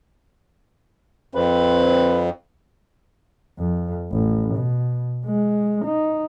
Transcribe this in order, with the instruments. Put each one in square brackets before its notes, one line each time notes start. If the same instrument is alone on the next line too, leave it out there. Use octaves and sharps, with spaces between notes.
[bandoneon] F2 [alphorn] C4 [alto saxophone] B4
[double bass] F2
A1
B2
G#3
D#4